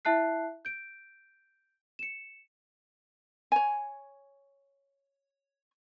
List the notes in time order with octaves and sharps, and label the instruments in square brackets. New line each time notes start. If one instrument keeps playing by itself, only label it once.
[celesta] E4 E5 A5 F#6 C7
G6 D7
C#7 E7
[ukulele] C#5 G#5